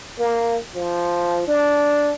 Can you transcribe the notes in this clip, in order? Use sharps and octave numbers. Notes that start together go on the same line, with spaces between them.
A#3
F3
D4